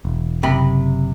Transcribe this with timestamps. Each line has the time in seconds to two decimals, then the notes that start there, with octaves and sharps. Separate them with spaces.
0.05 E1
0.43 F#1 C3 B5